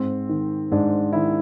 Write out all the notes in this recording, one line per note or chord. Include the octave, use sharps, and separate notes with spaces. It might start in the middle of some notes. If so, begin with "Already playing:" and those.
Already playing: G#2 C4
D#3
G#2 D4
D#3 E4